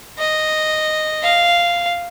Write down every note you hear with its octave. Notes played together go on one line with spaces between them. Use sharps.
D#5
F5